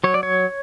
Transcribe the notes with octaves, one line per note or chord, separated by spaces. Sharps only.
F#3 C#5
D5
C#5